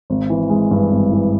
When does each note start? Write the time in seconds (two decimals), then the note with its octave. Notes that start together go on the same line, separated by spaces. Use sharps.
0.10 G#1
0.30 E3
0.50 G#3
0.71 G2
0.91 G#1
1.12 E3